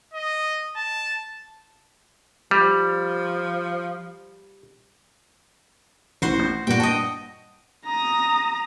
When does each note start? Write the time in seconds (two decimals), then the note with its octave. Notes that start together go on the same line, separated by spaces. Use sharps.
0.13 D#5
0.76 A5
2.51 F3 G3
6.22 A1 F#4 C5
6.40 G6
6.67 G2 A#2 F#4 G5
6.80 D#5 G5 A5
7.86 A#5 D#6